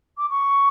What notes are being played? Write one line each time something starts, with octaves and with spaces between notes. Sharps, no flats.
D6
C#6